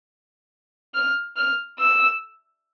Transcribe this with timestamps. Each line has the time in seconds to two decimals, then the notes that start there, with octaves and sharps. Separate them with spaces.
0.94 F6
1.37 F6
1.79 E6